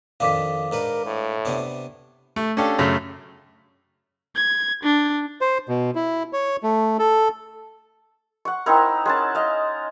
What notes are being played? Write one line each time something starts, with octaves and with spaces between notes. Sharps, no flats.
F2 D#3 D4 F5 D6 B6
G#2 D4 A#4 B4
A2
C3 B3 D4
A3
C#4 D4 G4 A4 F5
F#2 C#3 A3 C#4
G#6
D4
C5
B2
E4
C#5
A3
A4
F#5 C#6
C4 D#4 E4 A#4
G#3 C#4 A5
D#5 F5